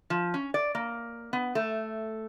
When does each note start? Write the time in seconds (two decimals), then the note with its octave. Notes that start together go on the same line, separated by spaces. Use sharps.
0.10 F3
0.34 C#4
0.54 D5
0.75 A#3
1.33 B3
1.55 A3